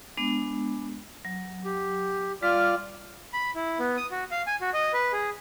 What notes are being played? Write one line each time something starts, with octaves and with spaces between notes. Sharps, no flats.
G#3 B3 D4
F#3
G4
G3 F4 D5 D6 F6
B5
E4
B3
D#6
F#4
F5
G#5
F#4
D#5
B4
G#4